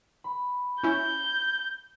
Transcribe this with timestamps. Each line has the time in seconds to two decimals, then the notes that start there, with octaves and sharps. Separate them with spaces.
0.24 B5
0.83 C#4 E4 G6